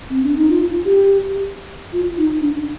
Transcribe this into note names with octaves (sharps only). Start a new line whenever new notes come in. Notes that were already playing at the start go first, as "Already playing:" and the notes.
C4
D4
D#4
F4
G4
F4
D#4
D4